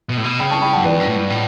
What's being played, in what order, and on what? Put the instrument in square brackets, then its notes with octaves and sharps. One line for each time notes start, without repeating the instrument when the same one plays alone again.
[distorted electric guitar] B2
A2
B2
[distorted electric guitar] C#3 [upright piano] G5 B5
[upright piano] A5 C#6
G5 B5
F#5 A5
[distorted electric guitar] F#2
[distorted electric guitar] E2 [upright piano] B4 D5
[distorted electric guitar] F#2
A2
G2
A2